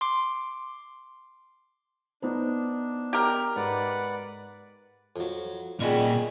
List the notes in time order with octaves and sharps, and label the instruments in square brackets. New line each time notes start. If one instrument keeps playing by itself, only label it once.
[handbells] C6 D6
[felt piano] B3 D#4 C5 [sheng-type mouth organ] D4
[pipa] G4 A#4
[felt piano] G#2 [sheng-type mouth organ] B4 D5 F#5
[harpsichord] F2 F#3
[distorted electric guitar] A#2 D#5 [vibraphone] F4 D5 G5 [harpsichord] G#4 B5 C#6